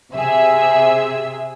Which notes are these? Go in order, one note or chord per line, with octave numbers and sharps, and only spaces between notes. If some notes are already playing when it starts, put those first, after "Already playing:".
C3 G#4 E5 E6